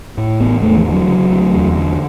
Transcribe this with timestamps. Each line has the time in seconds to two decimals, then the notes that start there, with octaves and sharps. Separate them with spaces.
0.18 A2
0.40 A1 B3
0.62 E2 A3
0.77 E3
0.85 D3
0.93 F#3
1.07 C#3
1.30 D2
1.53 E2
1.75 D3